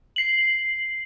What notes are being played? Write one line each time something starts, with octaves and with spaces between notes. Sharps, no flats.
C7 F#7